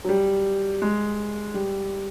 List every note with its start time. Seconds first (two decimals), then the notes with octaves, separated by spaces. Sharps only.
0.05 F#3
0.09 G3
0.82 G#3
1.54 G3